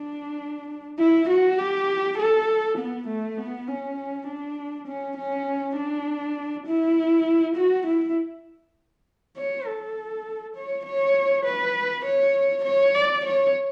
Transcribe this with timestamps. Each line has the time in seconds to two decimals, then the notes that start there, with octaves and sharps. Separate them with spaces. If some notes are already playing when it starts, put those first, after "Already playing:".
Already playing: D4
0.99 E4
1.29 F#4
1.58 G4
2.18 A4
2.77 B3
3.08 A3
3.37 B3
3.68 C#4
4.27 D4
4.87 C#4
5.17 C#4
5.76 D4
6.66 E4
7.56 F#4
7.87 E4
9.36 C#5
9.66 A4
10.56 C#5
10.85 C#5
11.45 B4
12.05 C#5
12.64 C#5
12.94 D5
13.25 C#5